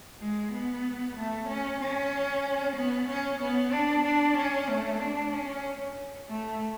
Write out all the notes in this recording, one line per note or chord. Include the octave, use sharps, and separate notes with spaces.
G#3
B3
A3
C#4
C#4
B3
C#4
B3
D4
D4
C#4
A3
D4
C#4
A3